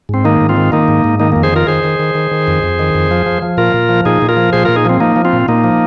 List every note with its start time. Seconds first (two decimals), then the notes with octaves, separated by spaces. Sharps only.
0.09 G#2 C4
0.24 D#3 A#3 D#4
0.41 G#2
0.49 C4 F4
0.57 D#3
0.72 D#3 A#3 D#4
0.88 G#2
1.04 G#2
1.20 D#3 A#3 D#4
1.32 F2 A#3
1.43 G#4 C5
1.52 D#3 F4 A#4
1.67 D#3 G#4 C5
1.84 D#3
2.00 D#3
2.15 D#3
2.31 D#3
2.47 F2
2.63 F2
2.79 D#3
2.94 F2
3.11 F3
3.26 F3
3.42 F3
3.57 A#2 F4 A#4
3.74 A#2
3.89 F3
4.05 A#2 D#4 G#4
4.22 A#2
4.29 F4 A#4
4.37 F3
4.53 A#2 G#4 C5
4.65 A#2 F4 A#4
4.76 D#4 G#4
4.85 F3 C4
5.00 F3 A#3 D#4
5.16 F3
5.25 C4 F4
5.33 A#2
5.48 A#2 A#3 D#4
5.64 F3